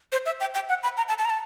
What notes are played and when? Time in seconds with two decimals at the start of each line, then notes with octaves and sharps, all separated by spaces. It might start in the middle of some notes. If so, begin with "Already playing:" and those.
0.12 C5
0.26 E5
0.40 G5
0.54 G5
0.69 F#5
0.83 B5
0.97 A#5
1.08 A5
1.18 A5
1.25 A#5
1.30 A5